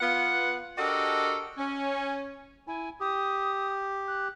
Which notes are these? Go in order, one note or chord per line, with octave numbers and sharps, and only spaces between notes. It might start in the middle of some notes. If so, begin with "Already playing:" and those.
B3 F4 F#5
D4 F#4 G4 A4 A#4 D#5
C#4
E4 G#5
G4 D#6
F#6